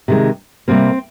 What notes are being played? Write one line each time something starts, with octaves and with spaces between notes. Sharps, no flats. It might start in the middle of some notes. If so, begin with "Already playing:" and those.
C3 D#3 G#3
C3 G3 A#3 C4